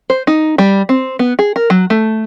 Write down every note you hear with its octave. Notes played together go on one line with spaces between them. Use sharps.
C5
D#4
G3
C4
B3
G#4
A#4
F#3
A3